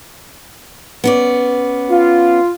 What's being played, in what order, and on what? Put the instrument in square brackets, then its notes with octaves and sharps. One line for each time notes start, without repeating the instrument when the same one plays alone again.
[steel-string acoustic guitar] B3 C#4 D5
[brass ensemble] F4